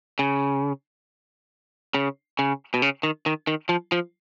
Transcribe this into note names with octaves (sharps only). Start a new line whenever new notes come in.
C#3
C#3
C#3
B2
C#3
D#3
D#3
D#3
F3
F3